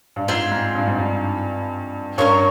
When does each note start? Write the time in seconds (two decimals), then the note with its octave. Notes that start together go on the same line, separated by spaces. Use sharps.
0.16 G2
0.28 G#2 C4 F4 G#4
0.51 G#2
0.75 G2
0.87 G#2
0.98 G2
2.18 G2 C#4 F4 A#4 C#5